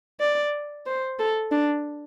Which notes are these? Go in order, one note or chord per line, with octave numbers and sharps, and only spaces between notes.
D5
C5
A4
D4